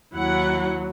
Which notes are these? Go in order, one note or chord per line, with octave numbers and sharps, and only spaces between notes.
D#2 F#3 E4 F#5